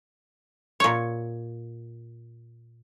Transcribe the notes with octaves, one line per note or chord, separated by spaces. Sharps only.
A#2 C#5